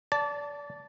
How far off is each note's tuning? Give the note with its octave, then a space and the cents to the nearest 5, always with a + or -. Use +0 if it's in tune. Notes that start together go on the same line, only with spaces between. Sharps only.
D5 -25 A5 +0